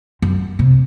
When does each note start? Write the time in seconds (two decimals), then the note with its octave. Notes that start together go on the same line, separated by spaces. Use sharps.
0.22 F#2
0.59 C3